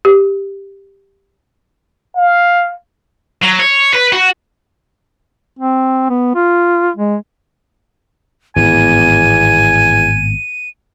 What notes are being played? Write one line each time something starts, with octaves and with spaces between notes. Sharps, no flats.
G4
F5
F#3
C#5
B4
F#4
C4
B3
F4
G#3
G#1 E2 A2 B3 G#5 D#7